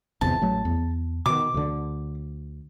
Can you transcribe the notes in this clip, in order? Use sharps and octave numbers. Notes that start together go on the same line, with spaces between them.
G1 E2 C3 A5
A1 F#3 A3
E2
B2 D#3 D6
D2 D3